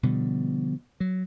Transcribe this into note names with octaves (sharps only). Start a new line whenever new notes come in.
B2 D3 F3 G3
F#3